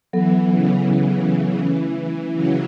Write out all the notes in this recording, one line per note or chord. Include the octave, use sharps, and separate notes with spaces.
E3 F#3 B3 A4
C#3
E3
A3 C#4 E4
C#3 F#3